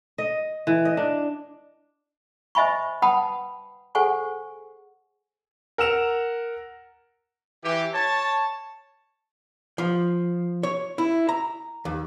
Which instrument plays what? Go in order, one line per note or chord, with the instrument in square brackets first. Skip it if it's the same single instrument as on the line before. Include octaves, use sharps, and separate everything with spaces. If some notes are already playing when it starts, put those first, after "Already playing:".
[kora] D#5
E3
D#5
D4
[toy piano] C5 D#5 E5 G#5 B5 C#6
B4 F#5 G5 A5 B5 D#6
G#4 A4 C5 F#5 G#5 C#6
[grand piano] A#4 F#5 E6 E7 F7
[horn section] E3 G4
C#5 A5
[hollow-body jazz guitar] F3
C#5
E4
A#5
D#2